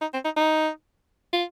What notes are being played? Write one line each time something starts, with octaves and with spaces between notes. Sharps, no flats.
D#4
C4
D#4
D#4
F4